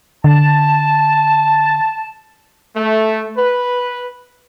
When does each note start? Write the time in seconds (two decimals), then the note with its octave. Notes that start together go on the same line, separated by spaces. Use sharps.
0.24 D3 A5
2.77 A3
3.38 B4